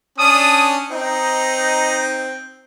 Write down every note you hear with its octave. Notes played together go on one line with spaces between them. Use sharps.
C#4 D4 A5 D#6
C4 D#4